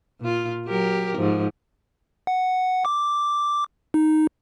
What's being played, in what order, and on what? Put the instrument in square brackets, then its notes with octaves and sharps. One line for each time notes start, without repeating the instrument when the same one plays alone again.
[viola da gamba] A#2 F4
F#3 G4 A#4
G#2 F3
[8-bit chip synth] F#5
D6
D#4